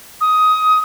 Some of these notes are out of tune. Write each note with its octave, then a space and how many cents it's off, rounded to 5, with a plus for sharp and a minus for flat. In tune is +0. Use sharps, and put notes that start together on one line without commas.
D#6 +15